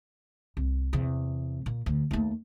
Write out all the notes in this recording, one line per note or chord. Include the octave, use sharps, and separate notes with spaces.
C2
E2 C3
A#2
D2
D#2 A3